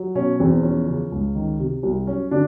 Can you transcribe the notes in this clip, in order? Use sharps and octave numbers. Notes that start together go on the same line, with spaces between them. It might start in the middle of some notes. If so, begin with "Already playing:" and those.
Already playing: F#3
B2 C#4
E2 C4
F3 C#4
C#3
C#2
D#3
C3
C2
F#3 C#4
D3 D4